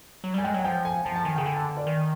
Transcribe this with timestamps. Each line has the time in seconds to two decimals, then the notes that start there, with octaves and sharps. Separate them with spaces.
0.24 F#3
0.34 G3 G#5
0.44 G#3 G5
0.54 F#3 F#5
0.64 F3 G5
0.85 G#5
1.05 F3 A5
1.16 A5
1.25 D#3 G#5
1.36 C#3 G5
1.46 D3 G#5
1.57 A5
1.77 D5
1.87 D#3